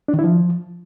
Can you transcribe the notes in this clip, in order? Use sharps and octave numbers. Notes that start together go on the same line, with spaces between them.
D4
D#3
E4
F3